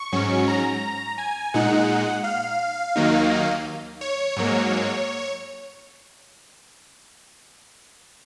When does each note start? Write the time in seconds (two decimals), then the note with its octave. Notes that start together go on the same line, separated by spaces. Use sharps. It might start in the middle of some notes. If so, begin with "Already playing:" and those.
Already playing: C#6
0.12 G#2 F#3 C#4
0.48 A#5
1.18 G#5
1.54 A#2 G#3 D#4 F#5
2.24 F5
2.96 D#2 D#3 F#3 A#3 D#4
4.01 C#5
4.37 G#2 F#3 A#3